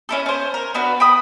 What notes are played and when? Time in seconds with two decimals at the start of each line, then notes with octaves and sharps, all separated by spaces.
0.09 C#4 E4 A4
0.26 C#4 C5
0.54 A#4
0.74 B3 D4 F#4 B4
1.00 G5 B5 D#6